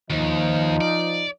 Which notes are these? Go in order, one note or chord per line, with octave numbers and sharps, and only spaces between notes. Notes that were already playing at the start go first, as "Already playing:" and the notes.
D#2 F3 D#4
D5